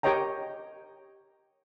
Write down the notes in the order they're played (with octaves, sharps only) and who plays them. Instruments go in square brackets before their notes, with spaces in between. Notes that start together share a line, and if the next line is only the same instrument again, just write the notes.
[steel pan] G4 A#4 C#5 D#5 G5 A#5